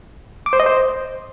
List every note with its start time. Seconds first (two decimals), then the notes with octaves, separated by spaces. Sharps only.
0.46 D6
0.53 C5
0.60 D#5
0.66 C5